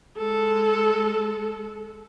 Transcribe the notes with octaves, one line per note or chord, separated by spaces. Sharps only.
G#3 A4